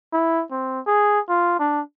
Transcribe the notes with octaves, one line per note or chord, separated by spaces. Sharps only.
E4
C4
G#4
F4
D4